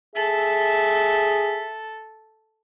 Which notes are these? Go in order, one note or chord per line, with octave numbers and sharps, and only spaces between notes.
G#4 A4 E5